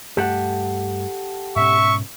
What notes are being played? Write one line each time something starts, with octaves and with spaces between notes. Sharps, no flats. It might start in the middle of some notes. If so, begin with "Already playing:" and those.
G2 A3 G4 A4 F#5
G#2 B2 C#4 E5 C#6